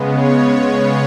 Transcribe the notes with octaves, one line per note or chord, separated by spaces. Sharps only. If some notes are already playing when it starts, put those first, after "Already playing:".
Already playing: C#3 G#3 B3
C#5